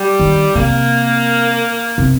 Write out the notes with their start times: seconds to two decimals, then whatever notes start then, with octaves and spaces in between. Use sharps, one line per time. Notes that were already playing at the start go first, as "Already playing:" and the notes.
Already playing: G3
0.20 D#3
0.55 C3 A#3
1.98 C3